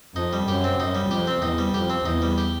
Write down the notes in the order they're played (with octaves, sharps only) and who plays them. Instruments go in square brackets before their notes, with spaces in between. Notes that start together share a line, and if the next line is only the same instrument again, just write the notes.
[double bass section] F2 [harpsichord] D#4
[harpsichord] G3
[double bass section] F#2 [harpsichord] G4
[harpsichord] C4
[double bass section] F#2 [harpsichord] D#4
[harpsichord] G3
[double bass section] F2 [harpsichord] G4
[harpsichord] C4
[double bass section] E2 [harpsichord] D#4
[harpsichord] G3
[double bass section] F2 [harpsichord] G4
[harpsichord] C4
[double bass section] E2 [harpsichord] D#4
[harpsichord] G3
G4